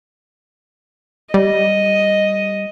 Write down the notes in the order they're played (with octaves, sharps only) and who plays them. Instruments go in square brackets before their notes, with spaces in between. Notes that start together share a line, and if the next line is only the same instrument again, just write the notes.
[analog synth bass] G3 [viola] D#5